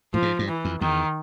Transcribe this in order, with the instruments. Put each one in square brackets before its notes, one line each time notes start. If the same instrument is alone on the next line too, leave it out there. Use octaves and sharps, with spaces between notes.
[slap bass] A2 [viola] F3
[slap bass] G#2
G2
[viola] E3
[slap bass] F2
[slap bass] E2 [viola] D#3